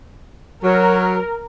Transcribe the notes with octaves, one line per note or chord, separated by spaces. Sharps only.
F#3 A#4